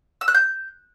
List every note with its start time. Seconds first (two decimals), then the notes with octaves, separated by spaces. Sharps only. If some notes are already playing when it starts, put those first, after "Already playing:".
0.21 E6
0.28 F#6
0.34 G6